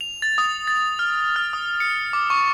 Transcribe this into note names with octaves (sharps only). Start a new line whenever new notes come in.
F7
A6
D#6
A6
F6
F6
D#6
C#7
D6
C#6